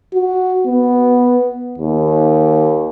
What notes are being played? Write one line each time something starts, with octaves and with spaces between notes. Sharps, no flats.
F#4
B3
D#2